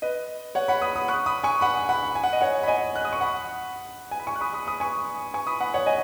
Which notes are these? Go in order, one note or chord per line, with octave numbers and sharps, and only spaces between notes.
B4 D#5
C#5 F#5
F#5 B5
B5 D#6
B5 D#6
C#6 F#6
B5 D#6
G#5 C#6
F#5 B5
F#5 B5
G#5
F#5
D#5
C#5 F#5
B5
D#5 G#5
F#6
D#6
C#6
F#5 B5
G#5
B5
G#5 C#6
F#6
B5 D#6
B5 D#6
B5 D#6
G#5 C#6
G#5 C#6
B5 D#6
F#5 B5
C#5 F#5
D#5 G#5